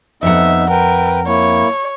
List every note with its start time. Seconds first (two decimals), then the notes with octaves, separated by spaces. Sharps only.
0.23 F2 B3 D#4 E5 F#5
0.70 A#4 B4 G5
1.27 A#3 E4 C#5